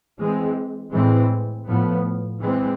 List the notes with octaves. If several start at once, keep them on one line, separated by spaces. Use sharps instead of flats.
E3 G#3 C4
A2 E3 G#3 C4
A2 F3 B3
E3 G#3 C4